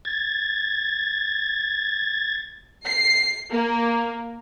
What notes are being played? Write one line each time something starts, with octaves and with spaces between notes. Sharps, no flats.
G#6 A6
C7
A#3